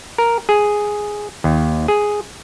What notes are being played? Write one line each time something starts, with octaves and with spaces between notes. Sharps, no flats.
A#4
G#4
D#2
G#4